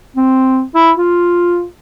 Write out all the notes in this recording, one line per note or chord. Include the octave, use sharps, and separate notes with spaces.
C4
E4
F4